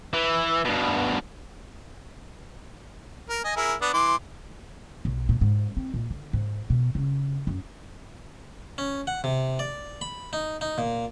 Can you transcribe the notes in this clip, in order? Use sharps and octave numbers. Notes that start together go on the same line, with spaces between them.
E3
G2 B2
A#4
D#5 G#5
E4 G#4 A#4
B3 D4
E3 C6 D6
B1
A#2
G#2
C4
A#2
D3
G#2
B2
C#3
F#2
C#4
F#5
C3
D5
B5
D#4
D#4
A#2